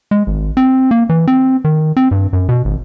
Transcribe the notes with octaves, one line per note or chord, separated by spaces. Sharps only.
G#3
G#1
C4
A#3
E3
C4
D#3
C4
G2
F#2
B2
G#1